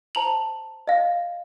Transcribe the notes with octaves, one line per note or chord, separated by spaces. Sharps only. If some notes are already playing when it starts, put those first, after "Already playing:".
C5 A5 A#5 F7 F#7
D#5 F5